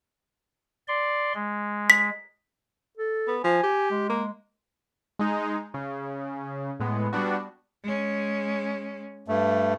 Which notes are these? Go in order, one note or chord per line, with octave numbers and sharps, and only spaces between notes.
D5 C6
G#3
B6
A4
B3
F3 G#5
G4
G#3
A#3
G#3 D#4
C#3
A2 G#3 B3
G3 B3 D4 F#4
G#3 C#4
G2 A3